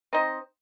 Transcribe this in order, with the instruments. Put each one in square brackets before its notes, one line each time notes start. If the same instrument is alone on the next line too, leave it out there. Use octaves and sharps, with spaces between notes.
[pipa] C4 D#4 C5 D#5